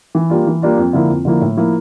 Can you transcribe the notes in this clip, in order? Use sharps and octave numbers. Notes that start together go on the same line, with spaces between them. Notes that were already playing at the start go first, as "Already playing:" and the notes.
E3
G3 A#3 D4 F4
E3
G3 A#3 D4 F4
F2
D3 F3 A#3 E4
F2
D3 F3 A#3 E4
A2
F3 A#3 E4